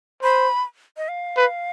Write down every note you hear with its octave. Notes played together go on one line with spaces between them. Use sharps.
C5 B5
D#5
F5
B4